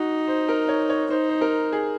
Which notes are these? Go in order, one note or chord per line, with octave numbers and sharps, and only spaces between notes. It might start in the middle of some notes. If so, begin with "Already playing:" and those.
Already playing: D#4 F#4
C5
A#4
C#5
C#5
D#4 C5
C5
A#4
G#4